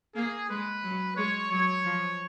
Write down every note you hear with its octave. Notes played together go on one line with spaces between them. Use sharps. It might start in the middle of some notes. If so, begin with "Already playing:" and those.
A#3 G#4
G#3 B4
F#3
G#3 C#5
F#3 C#5
F3